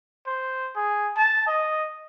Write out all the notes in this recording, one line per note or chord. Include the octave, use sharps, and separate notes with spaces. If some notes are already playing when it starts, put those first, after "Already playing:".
C5
G#4
A5
D#5